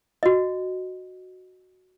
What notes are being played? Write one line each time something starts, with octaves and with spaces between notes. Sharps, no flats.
F#4 D#5